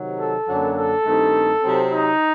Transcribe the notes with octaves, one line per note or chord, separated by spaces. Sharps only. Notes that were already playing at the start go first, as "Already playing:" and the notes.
Already playing: C3 D#3 F#3
A4
F#2 D3 F#3 A#3 D4
A4
G2 D#3 A3 C4 D#4
C3 F#3 C4 D#4
D#4